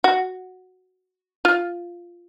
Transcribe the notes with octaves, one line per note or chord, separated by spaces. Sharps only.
F#4
F4